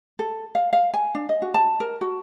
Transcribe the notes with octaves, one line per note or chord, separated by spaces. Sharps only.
A4
F5
F5
G#5
D4
D#5
F#4
A5
A#4
F#4